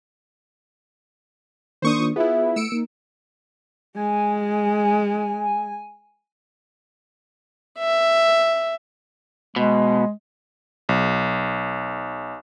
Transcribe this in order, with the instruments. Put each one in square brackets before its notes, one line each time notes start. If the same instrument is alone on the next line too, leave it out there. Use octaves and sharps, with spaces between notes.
[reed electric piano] D#3 A#3 D4 [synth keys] C5 C#6 D#6
[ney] F4
[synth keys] B3 E4 [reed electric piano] F4 G#4 [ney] E5
[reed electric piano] A3 [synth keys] E6 C#7 D7
[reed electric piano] A#3 [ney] D#4
[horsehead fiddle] G#3 [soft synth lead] G#5
[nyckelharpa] E5
[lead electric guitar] B2 [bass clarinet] G#3
[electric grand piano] B1